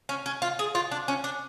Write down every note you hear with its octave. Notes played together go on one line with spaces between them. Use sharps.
C#4
C#4
F4
G#4
F4
D4
C#4
D4